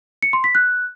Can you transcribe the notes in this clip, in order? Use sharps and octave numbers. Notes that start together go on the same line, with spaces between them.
C#7
C6
B6
F#6